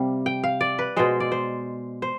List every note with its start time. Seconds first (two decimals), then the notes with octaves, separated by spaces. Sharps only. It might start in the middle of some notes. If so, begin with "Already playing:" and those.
Already playing: C3 G3 F5
0.26 G5
0.44 F5
0.61 D5
0.79 B4
0.96 B2 G#3 C5
1.20 D5
1.32 C5
2.02 C5